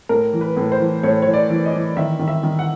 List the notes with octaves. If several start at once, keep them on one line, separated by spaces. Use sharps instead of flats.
A2 A#4
E3
B4
A2
C5
E3
A2 C#5
E3 C#5
D5
E3
D#5
E3
D#3 E5
D#3
E5
D#3
F#5